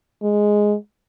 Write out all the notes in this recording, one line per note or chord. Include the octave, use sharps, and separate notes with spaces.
G#3